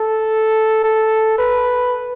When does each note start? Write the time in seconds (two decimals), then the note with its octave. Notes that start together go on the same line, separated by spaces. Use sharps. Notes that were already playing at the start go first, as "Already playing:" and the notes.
Already playing: A4
0.84 A4
1.38 B4